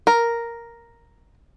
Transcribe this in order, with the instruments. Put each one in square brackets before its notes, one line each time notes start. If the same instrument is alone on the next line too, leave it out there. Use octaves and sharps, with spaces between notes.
[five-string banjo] A#4